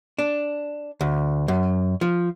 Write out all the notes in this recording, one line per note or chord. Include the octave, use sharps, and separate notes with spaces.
D4
D2
F#2
F3